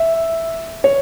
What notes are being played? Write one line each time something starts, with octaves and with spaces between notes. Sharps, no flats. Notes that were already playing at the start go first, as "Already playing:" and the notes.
Already playing: E5
C#5